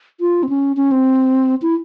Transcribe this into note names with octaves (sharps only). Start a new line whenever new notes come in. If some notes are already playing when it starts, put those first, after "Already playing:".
F4
C4
C#4
C#4
C4
E4